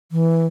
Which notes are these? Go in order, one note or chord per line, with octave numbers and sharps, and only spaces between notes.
E3